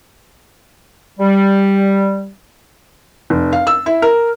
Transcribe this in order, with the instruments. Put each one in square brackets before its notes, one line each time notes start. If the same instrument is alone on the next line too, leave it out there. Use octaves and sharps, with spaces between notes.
[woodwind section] G3
[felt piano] F1
F5
E6
E4
A#4